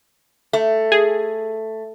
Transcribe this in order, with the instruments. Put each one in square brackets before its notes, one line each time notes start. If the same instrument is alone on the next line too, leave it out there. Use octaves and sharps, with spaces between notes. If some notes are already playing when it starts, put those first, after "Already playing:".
[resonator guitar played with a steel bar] A3
[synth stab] G#4